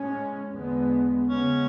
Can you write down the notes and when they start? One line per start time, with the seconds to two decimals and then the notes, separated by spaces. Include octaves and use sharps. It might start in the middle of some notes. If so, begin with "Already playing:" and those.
Already playing: A2 G#3 C#4
0.52 E2 D3 G#3 B3
1.27 C#3 G#3 B3 C#4